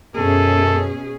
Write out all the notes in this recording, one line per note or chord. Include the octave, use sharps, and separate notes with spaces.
F#2 B2 C#4 G#4 A4